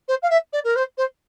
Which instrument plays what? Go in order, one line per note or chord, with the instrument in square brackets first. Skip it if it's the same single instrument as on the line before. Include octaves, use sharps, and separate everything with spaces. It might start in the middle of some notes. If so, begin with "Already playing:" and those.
[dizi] C5
F5
E5
D5
A#4
C5
C5